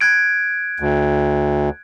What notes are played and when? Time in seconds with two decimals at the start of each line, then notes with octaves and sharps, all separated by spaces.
0.01 F#6 G#6 D7
0.80 D2